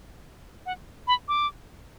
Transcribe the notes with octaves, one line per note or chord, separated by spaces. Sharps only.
F#5
B5
D6